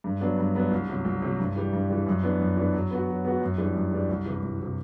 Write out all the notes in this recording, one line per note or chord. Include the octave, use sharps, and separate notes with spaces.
G2
F#3 B3 D4
G2
F#3 B3 D4
C2
C3 F#3
C2
C3 F#3
G2
E3 G3
G2
E3 G3
F#2
E3 B3 D4
F#2
E3 B3 D4
F#3
B3 F#4
F#3
B3 F#4
F#2
E3 G3 D4
F#2
E3 G3 D4
C2
C3 E3
C2
C3 E3